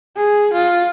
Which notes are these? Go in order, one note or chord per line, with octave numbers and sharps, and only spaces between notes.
G#4
F4